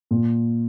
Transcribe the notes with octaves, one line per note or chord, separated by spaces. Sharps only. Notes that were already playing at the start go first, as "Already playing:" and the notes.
A#2